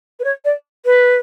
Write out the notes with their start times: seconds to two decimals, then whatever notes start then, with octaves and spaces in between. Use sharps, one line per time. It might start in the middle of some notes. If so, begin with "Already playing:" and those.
0.19 B4
0.24 C#5
0.44 D5
0.85 B4